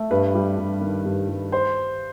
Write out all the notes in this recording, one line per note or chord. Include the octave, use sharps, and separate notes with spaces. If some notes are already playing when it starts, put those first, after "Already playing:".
Already playing: A3
G2 B4
G3
G2
D#3
G2
G3
C5